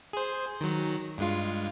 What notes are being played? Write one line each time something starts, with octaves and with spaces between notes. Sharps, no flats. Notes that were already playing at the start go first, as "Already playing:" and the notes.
G#4 C5
D#3 F#3
G2 G#3 F4